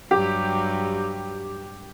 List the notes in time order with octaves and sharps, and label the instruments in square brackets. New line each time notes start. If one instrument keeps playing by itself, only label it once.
[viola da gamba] G2 F#3 [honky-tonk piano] G4